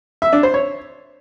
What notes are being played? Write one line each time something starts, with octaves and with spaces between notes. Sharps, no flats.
E5
D4
C5
C#5